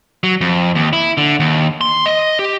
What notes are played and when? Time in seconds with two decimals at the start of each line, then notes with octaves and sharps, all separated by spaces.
0.23 F#3
0.41 F2
0.75 D#2
0.93 E4
1.17 D3
1.40 D#2
1.81 C6
2.06 D#5
2.39 G4